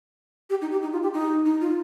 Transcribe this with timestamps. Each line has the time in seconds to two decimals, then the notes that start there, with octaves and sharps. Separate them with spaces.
0.50 G4
0.62 D#4
0.72 G4
0.82 D#4
0.93 F4
1.03 G4
1.13 D#4
1.46 D#4
1.61 F4